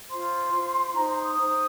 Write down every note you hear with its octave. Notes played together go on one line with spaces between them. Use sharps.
F4 C5 C6
F4 C5
D#4 C5 A#5
C6
D#6
D#4 C5